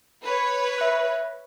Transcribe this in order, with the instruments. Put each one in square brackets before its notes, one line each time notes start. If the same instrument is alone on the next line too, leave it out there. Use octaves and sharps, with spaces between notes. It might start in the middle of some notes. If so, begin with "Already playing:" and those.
[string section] B4 C#5
[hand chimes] E5 F#6